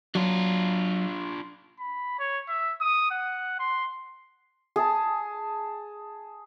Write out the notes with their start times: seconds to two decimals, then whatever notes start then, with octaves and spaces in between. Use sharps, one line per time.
0.15 F#3 D4 F4
1.79 B5
2.19 C#5
2.48 E5
2.81 D#6
3.11 F#5
3.59 C6
4.76 G#4 A5